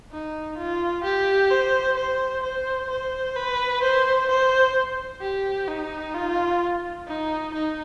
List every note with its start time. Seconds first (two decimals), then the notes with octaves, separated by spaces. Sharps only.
0.11 D#4
0.58 F4
1.04 G4
1.51 C5
1.97 C5
2.43 C5
2.90 C5
3.36 B4
3.82 C5
4.29 C5
5.22 G4
5.68 D#4
6.14 F4
7.07 D#4
7.54 D#4